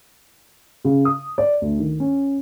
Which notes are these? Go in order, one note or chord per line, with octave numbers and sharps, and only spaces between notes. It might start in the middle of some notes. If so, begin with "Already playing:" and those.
C#3
D#6
D5
D2
D#3
C#4